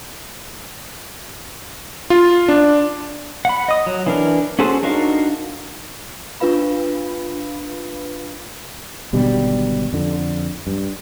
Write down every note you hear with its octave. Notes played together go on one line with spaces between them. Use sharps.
F4
D4
F#5 B5
D#5 D#6
F#3
E3 D4 A#4
C#4 F#4 G#4 A4 C5
D4 D#4 F#4 A#4 F5
D4 F4 B4 F5 B5
G#1 B2 D3 G3
F2 D3
G2